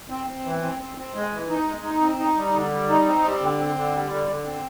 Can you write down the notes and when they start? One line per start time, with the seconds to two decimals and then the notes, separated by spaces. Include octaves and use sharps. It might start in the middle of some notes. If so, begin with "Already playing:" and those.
0.10 C4
0.27 C4
0.45 E3
0.62 C4
0.80 C4
0.98 C4
1.14 G#3
1.32 E3
1.50 D#4
1.67 G#3
1.84 D#4
2.01 C4
2.19 D#4
2.36 G3
2.54 D3
2.71 G3
2.89 D#4
3.06 C4
3.24 G3
3.41 D3
3.58 C4
3.75 D3
3.93 G3
4.11 D3
4.28 D3
4.45 C4